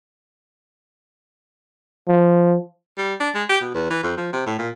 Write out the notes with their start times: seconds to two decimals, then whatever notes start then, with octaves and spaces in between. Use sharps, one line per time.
2.08 F3
2.97 G3
3.20 D4
3.35 G#3
3.49 G4
3.61 B2
3.74 E2
3.90 E3
4.03 F2
4.17 F3
4.33 C3
4.46 A2
4.59 A#2